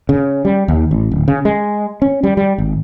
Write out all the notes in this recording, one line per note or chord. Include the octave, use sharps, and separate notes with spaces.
C#3
G3
D#2
A1
D1
C#3
G#3
C#4
G3
G3
G#1